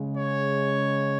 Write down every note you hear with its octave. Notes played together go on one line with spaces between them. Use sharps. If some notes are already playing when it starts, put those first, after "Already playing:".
Already playing: C#3 G#3
C#5